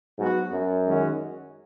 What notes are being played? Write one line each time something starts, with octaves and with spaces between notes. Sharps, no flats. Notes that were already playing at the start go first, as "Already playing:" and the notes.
G#2 F#3 B3 F#4
F#2
D#3 G#3 C#4 F#4